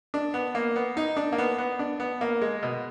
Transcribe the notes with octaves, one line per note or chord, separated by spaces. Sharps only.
D4
B3
A#3
B3
D#4
D4
A#3
B3
B3
D4
B3
A#3
G#3
B2